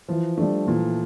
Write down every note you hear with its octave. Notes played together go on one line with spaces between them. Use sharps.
E3 F3
G3 A3 D4
A#2 E3